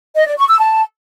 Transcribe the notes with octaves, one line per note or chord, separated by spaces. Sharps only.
D#5
D5
C#6
E6
A5